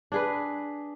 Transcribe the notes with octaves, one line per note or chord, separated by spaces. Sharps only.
D4 G#4 B4